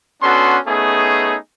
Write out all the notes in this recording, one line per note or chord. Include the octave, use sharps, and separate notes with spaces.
B3 C#4 D4 F#4 A4 C6
A3 B3 C#4 D#4 G#4